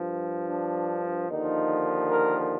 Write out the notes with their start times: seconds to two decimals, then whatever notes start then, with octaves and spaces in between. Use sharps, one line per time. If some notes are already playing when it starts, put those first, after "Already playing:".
Already playing: G2 F3
0.48 D4
1.29 D#2 D3 F3 D#4
2.09 A#4